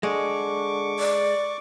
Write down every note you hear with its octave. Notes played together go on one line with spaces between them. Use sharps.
D3 G#3 C#6 D6
D5